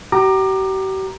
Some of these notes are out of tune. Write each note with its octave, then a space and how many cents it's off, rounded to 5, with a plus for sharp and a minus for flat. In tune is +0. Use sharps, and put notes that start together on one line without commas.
G4 -45 A#5 +5 D6 +25